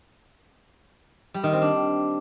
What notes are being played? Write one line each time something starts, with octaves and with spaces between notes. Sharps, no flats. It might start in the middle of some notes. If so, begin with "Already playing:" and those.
G3
D#3
C4
D4